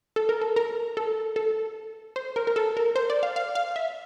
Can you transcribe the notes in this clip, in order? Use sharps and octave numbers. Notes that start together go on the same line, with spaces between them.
A4
A#4
A4
A#4
A4
A4
C5
A#4
A#4
A4
A#4
C5
D5
F5
F5
F5
E5